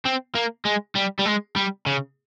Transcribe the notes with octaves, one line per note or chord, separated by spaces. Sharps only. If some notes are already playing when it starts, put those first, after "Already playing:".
C4
A#3
G#3
G3
G3
G#3
G3
C#3